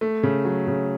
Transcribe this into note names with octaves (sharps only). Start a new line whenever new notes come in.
A3
C#3
F#3
C#3